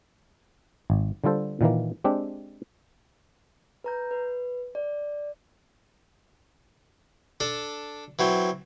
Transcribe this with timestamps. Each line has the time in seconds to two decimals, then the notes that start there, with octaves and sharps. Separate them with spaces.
0.90 G#1
1.24 D3 G3 F4 A4 C5
1.61 A#2 D#3 E3 A#3
2.04 G#3 C4 D4 G4
3.84 B4 A#5 G6
4.11 B4
4.75 D5
7.40 D4 A4
8.19 E3 F#3 C4